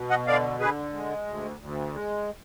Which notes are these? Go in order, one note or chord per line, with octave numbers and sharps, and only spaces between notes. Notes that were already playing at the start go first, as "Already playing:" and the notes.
Already playing: B2
D#5 F#5
D3 D5 F5
D3 G#4 B4
G#3
D2
D2
G#3